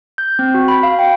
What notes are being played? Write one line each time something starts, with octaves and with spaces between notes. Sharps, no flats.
G6
C4
F#4
B5
F5
G5